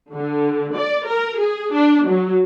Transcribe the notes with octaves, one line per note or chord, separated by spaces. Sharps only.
D3
D5
A#4
G#4
D4
F#3